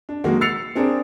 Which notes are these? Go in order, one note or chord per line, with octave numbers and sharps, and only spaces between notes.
D4
D#3 F#3 G#3 A#3 F#4
E6 A6 C7 C#7 F7
C4 D4 G#4 A#4 D5